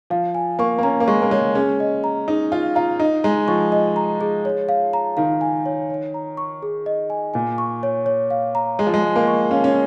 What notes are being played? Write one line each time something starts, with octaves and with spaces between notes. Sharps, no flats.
F3 F5
G#5
A#3 C#6
A#3
C#4 A#5
A#3
G#3 C#6
A#3
G#3 C#5
C#4 G#4
D#5
A#5
D#4 G#4
F4 F5
F4 A#5
D#4 D#5
G#3 A#5
F3 C#6
D#5
A#5
G#4
C#5
F5
A#5
D#3 F5
G#5
C#5
C#5
A#5
C#6
G#4
D#5
G#5
A#2 G#5
C#6
C#5
C#5
F5
A#5
G#3 G#4
F3
G#3
D#5
A#3
C#6
C#4 F5
C#4